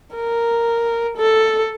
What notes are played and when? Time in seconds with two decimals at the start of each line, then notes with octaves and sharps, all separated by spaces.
0.15 A#4
1.17 A4